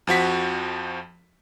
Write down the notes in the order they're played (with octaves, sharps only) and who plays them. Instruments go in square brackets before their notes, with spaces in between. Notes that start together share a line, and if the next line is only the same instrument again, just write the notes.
[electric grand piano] F2 F3 F#4 B6